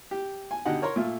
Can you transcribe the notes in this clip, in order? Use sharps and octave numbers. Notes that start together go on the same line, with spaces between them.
G4
G#5
B2 D3 D#4 G4 D#5 F#5
A#4 C#5 A#5 C6
A#2 A3 F4